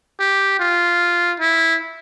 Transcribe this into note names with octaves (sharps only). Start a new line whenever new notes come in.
G4
F4
E4